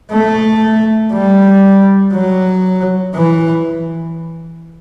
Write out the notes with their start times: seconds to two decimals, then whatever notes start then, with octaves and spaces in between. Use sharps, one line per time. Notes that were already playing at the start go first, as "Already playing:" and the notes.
0.11 A3
1.13 G3
2.13 F#3
3.15 E3